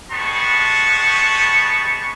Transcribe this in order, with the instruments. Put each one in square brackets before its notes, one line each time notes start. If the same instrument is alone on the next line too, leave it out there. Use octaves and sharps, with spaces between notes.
[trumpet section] G3 G#3 B3 C5 A5 C#6